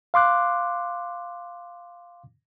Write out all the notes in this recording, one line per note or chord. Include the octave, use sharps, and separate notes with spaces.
F5 C6 D6 F#6